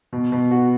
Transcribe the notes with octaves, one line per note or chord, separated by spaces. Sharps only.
B2
B2
F#4